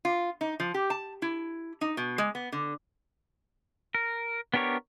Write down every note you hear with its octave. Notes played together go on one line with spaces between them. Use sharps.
F4
D#4
F3
G4
A5
E4
D#4
B2
G#3
B3
D3
A#4
B3 D4 G4 A#4 C#5